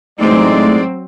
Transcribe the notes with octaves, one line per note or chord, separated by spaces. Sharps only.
A1 E3 F#3 G#3 A3 C4 D#4 D5